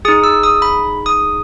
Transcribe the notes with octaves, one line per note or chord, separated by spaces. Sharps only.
D#4 G#4 D#6
E6
D#6
B5
D#6